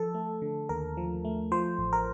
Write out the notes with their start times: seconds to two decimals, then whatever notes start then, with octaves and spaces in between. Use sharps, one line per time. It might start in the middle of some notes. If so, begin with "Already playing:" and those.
Already playing: F3 A4
0.14 A3
0.42 D3
0.69 D#2 A#4
0.97 F3
1.25 A3
1.52 F3 C5
1.78 A1
1.93 A#4